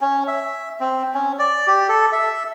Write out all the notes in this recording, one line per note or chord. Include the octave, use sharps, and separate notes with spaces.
C#4
E5
C4
C#4
D5
G4
A4
E5